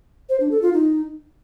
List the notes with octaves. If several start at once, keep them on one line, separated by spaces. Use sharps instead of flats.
C5
D4
A4
F4
D#4